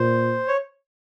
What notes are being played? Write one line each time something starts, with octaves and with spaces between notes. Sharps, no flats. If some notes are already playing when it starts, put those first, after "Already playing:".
Already playing: A#2 C5
C#5